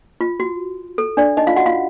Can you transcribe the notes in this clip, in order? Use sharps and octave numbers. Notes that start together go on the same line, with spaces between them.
F4
F#4
A4
D4 D5
D#4 D#5
F4 F5
F#4 F#5
F4 F5